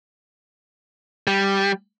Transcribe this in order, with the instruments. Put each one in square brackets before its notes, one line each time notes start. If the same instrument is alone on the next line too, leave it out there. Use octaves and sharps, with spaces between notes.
[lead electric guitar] G3